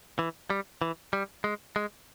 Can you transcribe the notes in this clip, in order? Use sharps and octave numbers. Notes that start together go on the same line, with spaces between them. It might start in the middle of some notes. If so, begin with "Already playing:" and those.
E3
G3
E3
G3
G#3
G#3